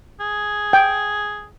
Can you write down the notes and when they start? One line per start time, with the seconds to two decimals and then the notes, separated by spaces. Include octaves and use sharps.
0.20 G#4
0.73 G5